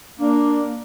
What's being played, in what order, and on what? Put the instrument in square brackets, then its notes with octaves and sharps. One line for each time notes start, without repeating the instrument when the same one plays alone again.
[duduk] A#3 [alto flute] D4